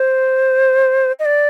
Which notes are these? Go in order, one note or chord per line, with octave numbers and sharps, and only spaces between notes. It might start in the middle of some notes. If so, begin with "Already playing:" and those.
Already playing: C5
D#5
D5